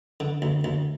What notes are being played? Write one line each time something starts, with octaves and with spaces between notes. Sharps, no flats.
D3
D2
D2